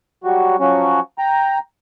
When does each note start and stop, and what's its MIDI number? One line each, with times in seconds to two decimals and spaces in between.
0.24 0.56 54
0.24 0.56 55
0.24 0.56 66
0.60 1.00 53
0.60 1.00 54
0.60 1.00 61
0.60 1.00 66
1.18 1.59 79
1.18 1.59 82